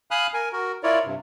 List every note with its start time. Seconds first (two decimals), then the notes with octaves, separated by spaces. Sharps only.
0.11 F5 G#5 B5 D#6 F6 F#6
0.34 A#4 G#5
0.53 F#4 A#4
0.83 E4 F4 A#4 C#5 D5
1.05 G2 C3